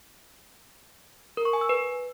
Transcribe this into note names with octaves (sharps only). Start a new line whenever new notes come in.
A#4
C#6
G#5
E6
B4